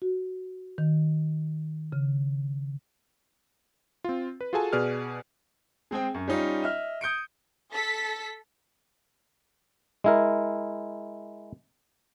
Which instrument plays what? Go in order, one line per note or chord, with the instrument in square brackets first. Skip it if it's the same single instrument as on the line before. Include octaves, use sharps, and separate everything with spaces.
[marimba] F#4
D#3
C#3
[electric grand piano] C4 F4
B4
F4 F#4 G#4 A4 G#5 A5
B2 G#4 B4 D5 F6
[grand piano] G#3 C4 G#4 G5
F#2
G3 C#4 D#4 F4
D#5 E5 F6
D#6 G6 C#7 D7
[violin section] A4 B6
[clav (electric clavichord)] G#3 E4 A#4